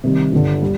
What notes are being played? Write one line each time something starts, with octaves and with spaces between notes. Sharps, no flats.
C3 D#3 G3
G1 G2 D3
G3